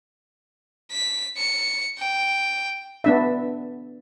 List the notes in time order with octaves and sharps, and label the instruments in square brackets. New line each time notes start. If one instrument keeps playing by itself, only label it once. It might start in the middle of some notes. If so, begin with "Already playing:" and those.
[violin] B6
C#7
G5
[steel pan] B3 D4 E5